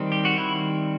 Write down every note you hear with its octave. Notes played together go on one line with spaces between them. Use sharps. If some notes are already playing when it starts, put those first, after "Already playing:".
Already playing: D#3 G3 C4
G4
F#4
E4